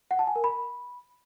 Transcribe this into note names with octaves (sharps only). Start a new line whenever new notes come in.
F#5
A5
G#5
A#4
B5